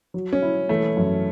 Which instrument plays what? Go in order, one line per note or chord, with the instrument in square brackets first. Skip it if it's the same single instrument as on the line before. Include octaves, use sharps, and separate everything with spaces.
[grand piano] F#3
[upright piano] C#4
[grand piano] E4
[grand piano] E3 [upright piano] A3
[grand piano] F#2